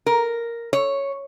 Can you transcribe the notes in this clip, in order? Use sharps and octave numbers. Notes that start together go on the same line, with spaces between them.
A#4
C#5